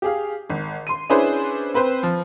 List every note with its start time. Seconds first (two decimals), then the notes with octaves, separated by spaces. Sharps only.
0.02 G4 G#4 F5
0.50 G#1
0.87 C6 D#7
1.09 C#4 D4 E4 G#4 B4 C5
1.74 C4 B4 C5
2.03 F3